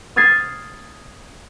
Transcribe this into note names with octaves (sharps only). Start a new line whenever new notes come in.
D#6 F6 G#6 A6 C7